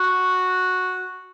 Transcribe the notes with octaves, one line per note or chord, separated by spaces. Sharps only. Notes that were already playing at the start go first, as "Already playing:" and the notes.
Already playing: F#4